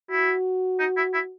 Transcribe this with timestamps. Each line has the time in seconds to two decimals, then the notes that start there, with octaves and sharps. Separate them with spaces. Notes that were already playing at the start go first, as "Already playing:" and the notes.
0.11 E4 F#4
0.79 D#4
0.97 E4
1.14 E4